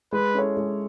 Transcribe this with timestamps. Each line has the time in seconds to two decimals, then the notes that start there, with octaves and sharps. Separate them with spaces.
0.12 G#3 B4
0.35 C#4 E4 A4 C#5
0.57 G#3